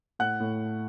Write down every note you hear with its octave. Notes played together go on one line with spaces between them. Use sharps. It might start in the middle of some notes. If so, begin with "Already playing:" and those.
A2 F#5 F#6
A2